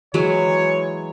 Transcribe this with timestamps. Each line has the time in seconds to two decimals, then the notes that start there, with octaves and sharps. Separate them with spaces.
0.14 E3 F#3 G#3 C#5